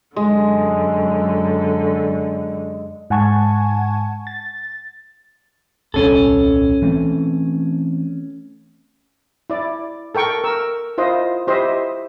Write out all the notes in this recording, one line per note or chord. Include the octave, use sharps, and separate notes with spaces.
F#2 D3 G#3
G#2 F#5 G#5 A5 C#6 G#6
A6
D#1 C2 C#4 A4
E3 A3 C4
E4 D5
A4 A#4 G5 C#6
A#4 E6
E4 F4 C5 D#5
E4 G4 C5 D#5 E5